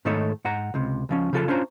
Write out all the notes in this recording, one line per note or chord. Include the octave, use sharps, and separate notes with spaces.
G#2 D#3 A3 D#4 A4 C#5
G#2 F#5 A#5
C#2 C3
C#2 F3 C#4
C#3 F3 F4 A4 D5 A5
C#4 D4 F4 C5 A#5 C6